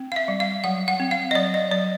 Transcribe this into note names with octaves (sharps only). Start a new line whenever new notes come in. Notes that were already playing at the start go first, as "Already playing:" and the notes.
Already playing: C4
F5
E5
G3
F5
F#3 F#5
F#5
C4
F5
D#5
F#3 D5
D#5
F#3 D5